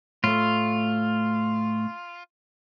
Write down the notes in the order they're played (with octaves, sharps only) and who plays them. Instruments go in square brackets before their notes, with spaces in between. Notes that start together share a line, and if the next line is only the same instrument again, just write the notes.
[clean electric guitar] A2 A3 [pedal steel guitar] F4